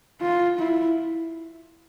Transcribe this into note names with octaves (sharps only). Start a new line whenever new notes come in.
F4
E4